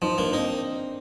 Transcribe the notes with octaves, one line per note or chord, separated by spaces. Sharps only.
F3 D#4
A#3 D4
C4 D#4